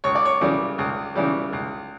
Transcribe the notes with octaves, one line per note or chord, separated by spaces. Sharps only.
C#2 C#5
D5
C#5
C#3 E3 G3
C#2
C#3 E3 G3
C#2